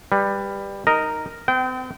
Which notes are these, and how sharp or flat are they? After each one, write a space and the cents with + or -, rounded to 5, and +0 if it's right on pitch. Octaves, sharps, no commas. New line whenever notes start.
G3 +15 B4 +0
D#4 +0 A#4 -5 D#5 +0
C4 -40 G5 -25